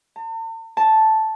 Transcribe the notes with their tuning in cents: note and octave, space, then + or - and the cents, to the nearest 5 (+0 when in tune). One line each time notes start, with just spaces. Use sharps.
A5 +45
A5 -5